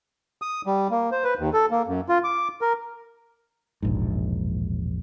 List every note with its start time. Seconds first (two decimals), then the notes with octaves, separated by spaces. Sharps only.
0.42 D#6
0.66 G3
0.91 A#3
1.12 C5
1.24 B4
1.39 D#2
1.53 A4
1.71 A#3
1.87 F#2
2.09 F4
2.24 D6
2.62 A#4
3.82 E1 A#1 G#2